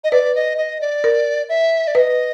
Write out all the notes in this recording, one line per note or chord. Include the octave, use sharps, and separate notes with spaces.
D#5
B4 D5
D#5
D#5
D5
A#4
E5
D5
B4 D#5 E5